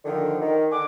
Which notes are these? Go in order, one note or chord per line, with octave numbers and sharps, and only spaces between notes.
D3 D#3 F3
D#3
D3 F#5 G#5 D6